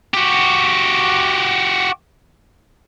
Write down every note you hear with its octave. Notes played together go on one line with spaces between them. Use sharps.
F#4 G4